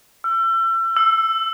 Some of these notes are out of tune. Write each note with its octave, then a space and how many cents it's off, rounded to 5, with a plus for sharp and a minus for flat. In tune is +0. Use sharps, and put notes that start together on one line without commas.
E6 +35
E6 +10